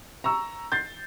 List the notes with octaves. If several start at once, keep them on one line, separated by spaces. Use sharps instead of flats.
A#5 C#6 E6
G6 A6 C7